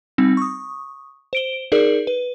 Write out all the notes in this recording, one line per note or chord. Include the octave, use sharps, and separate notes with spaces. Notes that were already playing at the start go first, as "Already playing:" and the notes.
G3 C4 D#4
C#6 D#6
C5 D7 G7
D#4 G#4 A#4 D5
B4